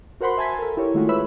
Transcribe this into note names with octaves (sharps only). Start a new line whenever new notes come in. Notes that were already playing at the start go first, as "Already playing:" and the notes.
F#4 A#4 C5 F#5 B5 C6
E5 G#5 A5 G#6 B6
A4 A#4
E4 G4 A#4 C#5
D#3 G#3 A3 F4 F#4 G#4
B4 C#5 E5 B5 E6